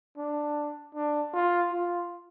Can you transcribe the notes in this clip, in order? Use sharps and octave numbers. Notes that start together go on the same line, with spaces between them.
D4
D4
F4
F4